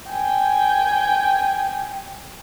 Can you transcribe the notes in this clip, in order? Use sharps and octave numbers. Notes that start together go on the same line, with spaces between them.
G5 G#5